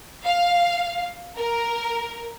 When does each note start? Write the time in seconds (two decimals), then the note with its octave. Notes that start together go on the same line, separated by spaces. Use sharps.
0.25 F5
1.37 A#4